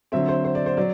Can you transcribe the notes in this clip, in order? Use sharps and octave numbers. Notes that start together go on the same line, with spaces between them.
D3 F#3 C4 E5
C5
C5
D5
C5
F#3 D5